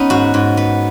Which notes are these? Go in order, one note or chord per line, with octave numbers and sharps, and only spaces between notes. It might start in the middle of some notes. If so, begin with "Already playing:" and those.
Already playing: B3 C#4 D#4
G#2 F#4
G#2
B3